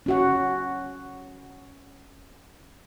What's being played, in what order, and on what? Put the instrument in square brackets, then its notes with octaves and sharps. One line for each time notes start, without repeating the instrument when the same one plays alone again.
[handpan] C#4 F#4 F#5